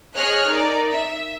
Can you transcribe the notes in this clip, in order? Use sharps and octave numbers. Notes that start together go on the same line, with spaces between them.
G#4 C#5 D#5 F6 F#6
D#4 A#4 D5
E5